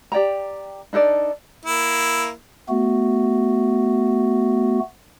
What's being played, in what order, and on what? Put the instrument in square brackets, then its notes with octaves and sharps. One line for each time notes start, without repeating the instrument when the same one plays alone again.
[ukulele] G4 D5 G5 A#5
D4 D#4 A4 D5
[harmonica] A#3 E4
[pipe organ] A3 B3 F#4